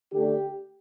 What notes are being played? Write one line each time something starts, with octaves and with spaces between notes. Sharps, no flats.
D3 A3 D4 G4